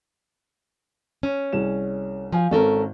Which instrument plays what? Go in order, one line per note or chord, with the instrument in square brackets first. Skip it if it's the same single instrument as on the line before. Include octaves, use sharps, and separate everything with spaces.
[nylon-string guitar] C#4
[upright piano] C2 G#4 E7
[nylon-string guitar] F3 [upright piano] F5 G#5
[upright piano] G#1 C4 [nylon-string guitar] C#4 A4 A#4